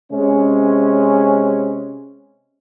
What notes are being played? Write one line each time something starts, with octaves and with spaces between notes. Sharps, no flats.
C3 G#3 C#4